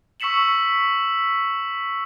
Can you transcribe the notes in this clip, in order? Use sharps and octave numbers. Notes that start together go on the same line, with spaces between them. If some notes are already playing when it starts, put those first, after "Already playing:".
C#6 E6 B6 C#7 E7 F#7